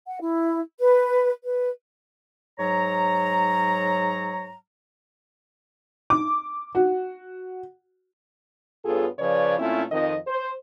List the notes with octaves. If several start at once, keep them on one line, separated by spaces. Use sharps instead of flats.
F#5
E4
B4
B4
G#2 F#3 C#5 A#5
D6
F#4
G2 B3 F4 G#4 A4 C#5
C#3 F3 B4 C#5 D5
A#2 A3 C4 C#4 E4 F4
F2 D#3 D#5
C5